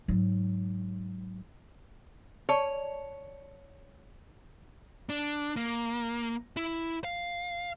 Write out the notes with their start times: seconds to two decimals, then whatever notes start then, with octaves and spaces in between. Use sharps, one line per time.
0.08 G#2 F#3
2.49 C#5 D5 A5 A#5
5.09 D4
5.57 A#3
6.57 E4
7.04 F5